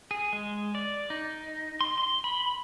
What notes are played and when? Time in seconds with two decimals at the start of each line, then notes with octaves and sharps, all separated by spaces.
0.11 G#4
0.33 G#3
0.75 D5
1.10 D#4
1.81 C6
1.98 C6
2.24 B5